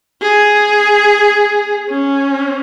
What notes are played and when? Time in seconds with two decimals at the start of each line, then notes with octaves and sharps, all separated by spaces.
0.21 G#4
1.89 C#4